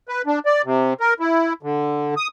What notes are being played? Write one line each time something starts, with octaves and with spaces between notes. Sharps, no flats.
B4
D4
D5
C3
A#4
E4
D3
D#6